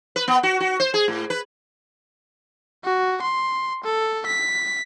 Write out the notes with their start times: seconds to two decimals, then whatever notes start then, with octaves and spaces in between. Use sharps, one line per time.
0.16 B4
0.28 B3
0.43 F#4
0.60 F#4
0.80 C5
0.94 G#4
1.08 A2
1.30 B4
2.84 F#4
3.22 C6
3.84 A4
4.26 B6